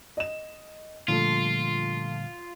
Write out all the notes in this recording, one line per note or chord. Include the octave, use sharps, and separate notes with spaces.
D#5 E7
A#2 D3 F3 G3 A3 F4